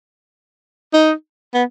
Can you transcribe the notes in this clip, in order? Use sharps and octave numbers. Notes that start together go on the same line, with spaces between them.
D#4
B3